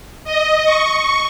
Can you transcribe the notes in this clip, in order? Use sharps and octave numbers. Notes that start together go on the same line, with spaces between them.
D#5
C#6